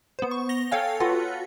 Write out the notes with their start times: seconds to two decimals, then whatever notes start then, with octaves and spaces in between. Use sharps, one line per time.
0.19 B3 C5
0.31 C#6
0.49 A#6 F7 G7
0.71 A4 C#5 F5 G5 G#5
1.00 F4 F#4 A4 B4 F#5